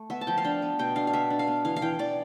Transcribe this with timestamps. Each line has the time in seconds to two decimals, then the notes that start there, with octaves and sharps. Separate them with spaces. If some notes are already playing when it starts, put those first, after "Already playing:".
Already playing: A3
0.10 B3 E5
0.21 A5
0.27 F3 G5
0.38 F5
0.45 D4 G5
0.62 B3
0.79 B2 G5
0.96 D4 F5
1.07 F5
1.13 B3 E5
1.30 D4
1.39 F5
1.47 B3
1.65 E3 F5
1.76 F5
1.82 E3 G5
1.99 E3 D5